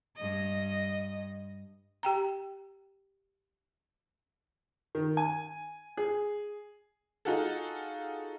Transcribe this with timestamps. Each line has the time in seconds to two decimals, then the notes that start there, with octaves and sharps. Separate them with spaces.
0.16 G2 D#5
2.03 G4 G5 A#5
4.95 D#3
5.17 G#5
5.97 G#4
7.25 D#4 F4 F#4 G#4 A4